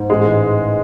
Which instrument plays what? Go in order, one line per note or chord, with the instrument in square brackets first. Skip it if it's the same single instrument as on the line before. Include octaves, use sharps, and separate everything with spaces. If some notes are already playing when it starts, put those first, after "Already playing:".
Already playing: [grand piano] G#2
[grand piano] A1 [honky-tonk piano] G#3
[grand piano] E3